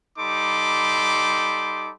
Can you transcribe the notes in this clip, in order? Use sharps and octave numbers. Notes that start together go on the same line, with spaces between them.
G3 D#4 A4 B5 C6 D6